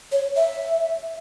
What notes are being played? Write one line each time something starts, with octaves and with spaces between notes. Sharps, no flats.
C#5
E5